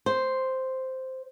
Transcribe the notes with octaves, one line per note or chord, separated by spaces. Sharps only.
C5